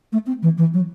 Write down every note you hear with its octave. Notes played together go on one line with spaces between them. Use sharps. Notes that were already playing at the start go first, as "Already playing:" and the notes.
A3
C4
E3
E3
F#3